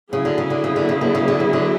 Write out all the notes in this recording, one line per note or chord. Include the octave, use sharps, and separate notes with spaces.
C#3 F#3 B3 E4 G#4
D3
C#3
D3
C#3
D3
C#3
D3
C#3
D3
C#3
D3